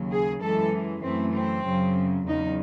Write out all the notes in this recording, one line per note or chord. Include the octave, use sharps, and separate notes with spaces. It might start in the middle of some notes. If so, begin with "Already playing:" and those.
Already playing: D#2 C#3 F#3
G#4
F#2 E3 G#3 A4
F#2 E3 A3 C4
C4
F#2 C#3 F#3
E2 C#3 F#3 D#4